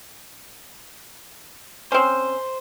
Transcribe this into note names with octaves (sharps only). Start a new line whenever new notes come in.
C4 C#4 C5